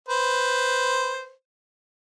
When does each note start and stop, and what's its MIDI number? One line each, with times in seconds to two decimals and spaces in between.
0.09 1.32 71
0.09 1.32 72